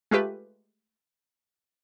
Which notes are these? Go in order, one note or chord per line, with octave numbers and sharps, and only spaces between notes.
G#3 A3 F4 G4 B4